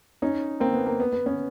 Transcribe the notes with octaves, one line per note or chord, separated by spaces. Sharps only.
C#4 D#4
A#3 C4
B3
A#3
B3
B3
B3 C#4